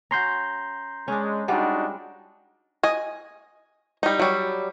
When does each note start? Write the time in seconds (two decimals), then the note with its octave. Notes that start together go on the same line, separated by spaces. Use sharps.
0.11 C#4 F#4 A#5 C6 G6
1.08 G#3 C#4 D4
1.48 G3 G#3 D4 D#4 F4 F#4 F#5
2.83 D#5 G#5
4.03 G3 D#4
4.19 F#3 G3